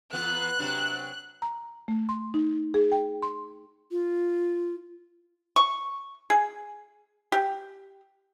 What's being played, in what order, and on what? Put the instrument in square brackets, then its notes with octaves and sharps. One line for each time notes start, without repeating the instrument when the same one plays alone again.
[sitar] E2 B3 F4 [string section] F#6
[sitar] C3 F#3 D4
[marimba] A#5
A3
C6
D#4
G#4
G5
C6
[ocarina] F4
[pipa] C#6
G#4
G4